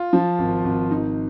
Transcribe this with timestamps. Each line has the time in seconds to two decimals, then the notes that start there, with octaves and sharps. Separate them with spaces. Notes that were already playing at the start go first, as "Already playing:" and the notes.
Already playing: F4
0.13 F3
0.39 G#1
0.64 G#1
0.91 D#4